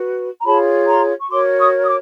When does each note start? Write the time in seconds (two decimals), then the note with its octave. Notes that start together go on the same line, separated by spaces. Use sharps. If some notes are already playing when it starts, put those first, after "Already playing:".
Already playing: F#4 B4
0.40 A#5
0.43 F4 G#4 C#5 A5 B5
0.86 A#5 C6
1.18 C#6
1.29 F#4 A#4 C#5 C6 D6
1.58 C#6 D#6
1.82 D#6
1.86 D6